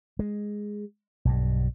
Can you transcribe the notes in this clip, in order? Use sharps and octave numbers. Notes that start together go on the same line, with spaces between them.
G#3
B1 G2